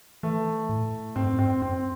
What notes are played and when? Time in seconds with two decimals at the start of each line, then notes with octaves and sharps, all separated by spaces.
0.23 E3 A3
0.69 A2
1.16 G#2 C4
1.25 F#2
1.34 G#2
1.39 C4
1.62 F#2 C4